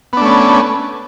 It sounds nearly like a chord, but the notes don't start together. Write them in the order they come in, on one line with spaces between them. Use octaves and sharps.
B3 D4 A3 C#4